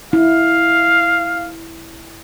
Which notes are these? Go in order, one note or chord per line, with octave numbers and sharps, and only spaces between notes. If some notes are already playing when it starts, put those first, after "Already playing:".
E4 F5